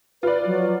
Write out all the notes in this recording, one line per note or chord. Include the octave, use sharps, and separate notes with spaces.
F4 B4 D5
F#3